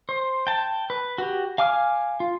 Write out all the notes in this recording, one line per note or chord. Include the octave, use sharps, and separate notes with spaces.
C5
G5 A5
B4
F#4 G4
F5 G#5 D6 F6
F4